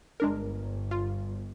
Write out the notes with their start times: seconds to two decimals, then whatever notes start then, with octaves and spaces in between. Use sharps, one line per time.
0.20 G1 G#3 D4 A#4
0.91 F4